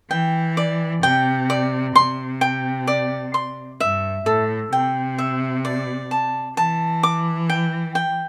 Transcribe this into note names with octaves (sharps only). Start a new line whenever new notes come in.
E3 G5
D5
C3 G5
D5
C3 C6
G5
D5
C6
G2 E5
A2 A4
C3 G5
E5
D5
A5
E3 A5
D6
G5
G5